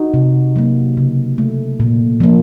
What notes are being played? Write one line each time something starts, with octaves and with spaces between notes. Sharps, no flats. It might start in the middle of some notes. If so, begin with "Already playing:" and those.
Already playing: D#4 F#4
C3
F#3 A#3
C#3
A3
A#2
F3 A#3